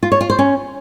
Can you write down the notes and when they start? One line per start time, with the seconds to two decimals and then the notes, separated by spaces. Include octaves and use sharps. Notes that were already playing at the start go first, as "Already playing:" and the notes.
0.03 F4
0.12 C#5
0.21 F4
0.30 C5
0.39 C#4